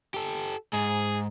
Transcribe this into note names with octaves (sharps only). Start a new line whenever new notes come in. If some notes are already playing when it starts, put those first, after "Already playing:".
G4 A4
G#2 G#4